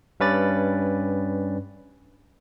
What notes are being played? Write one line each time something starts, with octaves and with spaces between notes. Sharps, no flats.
G2 C#4 B4 D5 A6